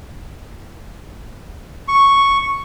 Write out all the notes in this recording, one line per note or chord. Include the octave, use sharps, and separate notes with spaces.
C#6